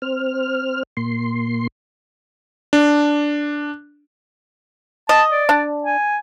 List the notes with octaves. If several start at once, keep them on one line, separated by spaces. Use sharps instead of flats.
C4 F6
A#2 C6
D4
D#5 A5
D5
D4
G#5